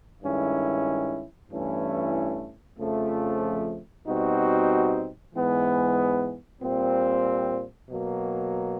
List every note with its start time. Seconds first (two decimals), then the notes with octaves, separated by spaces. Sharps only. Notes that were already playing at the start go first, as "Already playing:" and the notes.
0.22 G2 D#3 G#3 C#4 E4
1.50 G2 E3 A3 C#4 E4
2.78 F2 C#3 F3 A3
4.06 B2 G3 C4 D#4 F#4
5.34 G#2 E3 G#3 B3
6.62 A#2 G3 C4
7.89 B2 F#3 A#3